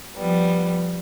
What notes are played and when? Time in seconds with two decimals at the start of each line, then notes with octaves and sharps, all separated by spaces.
0.15 F3 G3 B3